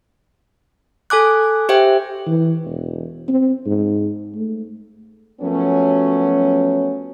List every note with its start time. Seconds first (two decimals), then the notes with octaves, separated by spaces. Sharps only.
1.10 A4 G#5 D6 F#6
1.69 G4 C5 E5 G5
2.27 E3
2.64 E1
3.28 C4
3.66 G#2
4.35 A3
5.41 F#2 F3 F#3 A3 B3 C#4